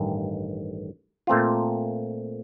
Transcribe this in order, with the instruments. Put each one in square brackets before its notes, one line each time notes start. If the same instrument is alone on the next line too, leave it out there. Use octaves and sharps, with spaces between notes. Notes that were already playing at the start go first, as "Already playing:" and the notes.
Already playing: [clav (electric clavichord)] A1 G2 D#3
A#2 A3 C4 F4